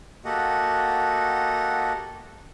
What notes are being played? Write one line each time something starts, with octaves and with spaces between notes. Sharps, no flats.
A#3 F#4 G4 A4 D#5 F#5